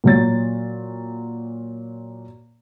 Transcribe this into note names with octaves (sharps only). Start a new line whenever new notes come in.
A#2 F#3 A6